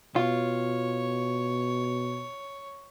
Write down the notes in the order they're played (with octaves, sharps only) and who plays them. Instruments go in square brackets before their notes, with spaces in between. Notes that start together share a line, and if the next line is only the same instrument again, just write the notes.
[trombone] B2 [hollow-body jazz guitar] F4 [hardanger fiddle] C#5